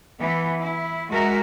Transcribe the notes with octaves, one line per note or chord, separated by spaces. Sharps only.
E3 B3
E4
G#3 F#4 A#4 E5